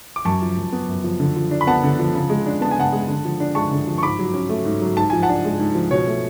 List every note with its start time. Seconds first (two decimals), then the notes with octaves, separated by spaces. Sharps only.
0.16 D6
0.25 F#2 A5 C#6
0.42 F3
0.57 F#2
0.72 B3
0.88 F#2
1.04 F3
1.20 D3
1.36 F3
1.51 D4
1.61 B5
1.67 B3 F#5 A5
1.83 D3
1.99 F3
2.14 C#3
2.30 G#3
2.46 D4
2.61 B3 A5
2.71 G#5
2.77 C#3 F#5 A5
2.92 G#3
3.08 D3
3.25 F3
3.40 D4
3.55 G#3 A5 C#6
3.71 D3
3.87 F3
3.98 C#6
4.03 G#2 B5 D6
4.19 F#3
4.34 C#4
4.49 A3
4.65 G#2
4.82 F#3
4.97 G#2 A5
5.10 F3 G#5
5.23 F#5 A5
5.29 D4
5.45 G#3
5.59 G#2
5.75 F3
5.91 B2 C#5
6.07 A3